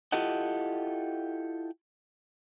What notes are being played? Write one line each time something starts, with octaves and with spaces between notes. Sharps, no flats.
E4 F4 G4 A4 D#5 F#5